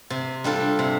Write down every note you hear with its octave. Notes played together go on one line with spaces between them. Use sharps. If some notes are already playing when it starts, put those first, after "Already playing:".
C3
G3 D4 F4 A4
C3